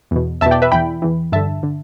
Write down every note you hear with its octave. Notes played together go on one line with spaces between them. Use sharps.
E2 B2
E2 B2 E5 A5
D5 G5
B4 E5
E2 E3 G5 B5
E2 E3
G2 D3 E5 A5
D3